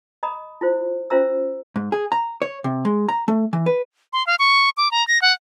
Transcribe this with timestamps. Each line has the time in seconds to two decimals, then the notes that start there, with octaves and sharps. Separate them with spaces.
0.23 D#5 A#5 B5 D#6
0.61 E4 F4 C5
1.10 C#4 F4 C5 E5 A#5 E6
1.76 G#2
1.92 G#4
2.12 A#5
2.42 C#5
2.64 C3
2.85 G#3
3.08 A#5
3.28 A3
3.53 E3
3.66 B4
4.13 C6
4.27 F5
4.39 C#6
4.77 D6
4.91 A#5
5.08 A#6
5.22 F#5